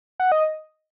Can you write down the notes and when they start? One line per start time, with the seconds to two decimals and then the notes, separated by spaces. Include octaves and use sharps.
0.20 F#5
0.32 D#5